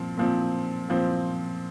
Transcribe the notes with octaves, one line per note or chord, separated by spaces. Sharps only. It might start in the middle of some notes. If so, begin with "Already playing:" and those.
Already playing: A#2 F3 C4
A#2 F3 C4
A#2 F3 C4